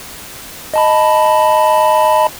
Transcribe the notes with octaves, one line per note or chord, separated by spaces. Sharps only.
D#5 A5 B5